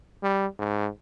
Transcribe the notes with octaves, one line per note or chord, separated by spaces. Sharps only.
G3
G#2